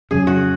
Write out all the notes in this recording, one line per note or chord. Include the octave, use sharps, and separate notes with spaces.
F2 C#3 F#3 C#4 G#4
F#4